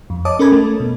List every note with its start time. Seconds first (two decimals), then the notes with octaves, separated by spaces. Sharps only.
0.10 F2
0.25 C#5 D#5 A5 D6 D#6
0.39 C#4 A4 A#4 B5 G#6
0.52 A3
0.80 B2